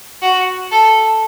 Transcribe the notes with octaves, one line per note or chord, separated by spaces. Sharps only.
F#4
A4